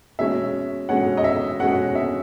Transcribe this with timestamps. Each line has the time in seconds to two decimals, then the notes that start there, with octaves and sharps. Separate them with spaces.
0.19 B2 G#3 C#4 E5
0.89 B2 G#3 C#4 F#5
1.17 D#5
1.24 E5
1.60 B2 G#3 C#4 F#5
1.95 E5